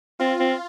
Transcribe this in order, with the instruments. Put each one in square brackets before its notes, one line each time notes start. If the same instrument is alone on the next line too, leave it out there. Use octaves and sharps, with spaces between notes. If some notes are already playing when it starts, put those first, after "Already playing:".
[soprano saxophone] C4 [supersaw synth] F4
[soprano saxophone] C4